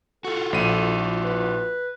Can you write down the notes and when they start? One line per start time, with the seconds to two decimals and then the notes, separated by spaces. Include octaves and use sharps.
0.25 F4 F#4 A4
0.53 A#1 D#7
1.24 B4